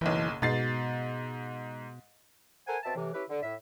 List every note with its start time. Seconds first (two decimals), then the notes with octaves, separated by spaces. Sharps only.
0.01 F#1 B1 E3
0.42 G#2 B2 A6 C7
2.67 A4 A#4 C5 F#5 G#5
2.83 B2 C4 E5 A5
2.96 A2 C3 E3
3.14 C#4 E4 G4 B4
3.29 D3
3.43 A2 E5